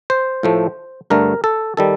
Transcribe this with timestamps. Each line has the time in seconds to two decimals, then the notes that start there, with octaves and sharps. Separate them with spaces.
0.10 C5
0.43 A2 F3 A3
1.10 G2 D3 A3 A#4
1.44 A4
1.77 D#3 G3 A4